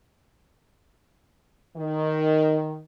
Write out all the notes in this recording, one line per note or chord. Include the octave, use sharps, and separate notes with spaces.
D#3